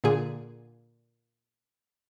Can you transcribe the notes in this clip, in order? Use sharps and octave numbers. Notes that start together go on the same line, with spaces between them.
A#2 D3 G#4